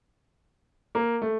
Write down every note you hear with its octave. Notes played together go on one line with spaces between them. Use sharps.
A#3
A3